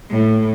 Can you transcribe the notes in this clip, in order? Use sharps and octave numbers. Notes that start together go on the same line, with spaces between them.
A2